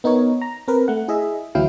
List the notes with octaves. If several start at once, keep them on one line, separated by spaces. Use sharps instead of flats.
B3 D#4 A#4 C#5
A#5
C4 A#4 B4
A3 F#5
E4 G#4 D#5 E5
D2 E3 F#3 E4 F5 G5